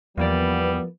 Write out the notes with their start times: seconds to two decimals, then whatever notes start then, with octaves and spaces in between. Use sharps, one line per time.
0.17 E2 E3 F3 G3 A#3 B3 D5